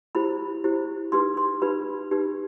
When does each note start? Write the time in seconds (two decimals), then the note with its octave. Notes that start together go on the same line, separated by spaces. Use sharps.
0.15 E4 G4 C5 B5
0.64 E4 G4 C5
1.12 D#4 G4 B4 C6
1.37 C6
1.62 D#4 G4 B4 B5
2.11 D#4 G4 B4